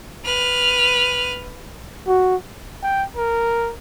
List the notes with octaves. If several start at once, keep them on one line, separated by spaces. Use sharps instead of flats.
B4 F6
F#4
G5
A#4